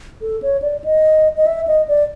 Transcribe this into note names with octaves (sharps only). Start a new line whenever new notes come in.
A4
C#5
D5
D#5
D#5
E5
D#5
D5